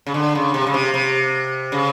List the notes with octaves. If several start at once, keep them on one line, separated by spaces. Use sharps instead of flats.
C#3
D3
C#3
C3
C#3
C3
C3
C#3